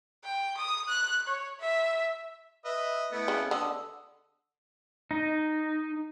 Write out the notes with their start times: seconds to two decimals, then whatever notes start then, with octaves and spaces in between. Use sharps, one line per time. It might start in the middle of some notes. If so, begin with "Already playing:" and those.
0.24 G5
0.57 D#6
0.88 F#6
1.27 C#5
1.60 E5
2.65 B4 D#5 E5
3.12 A3 B3 E4
3.28 C#3
3.51 D3 D#6 E6
5.11 D#4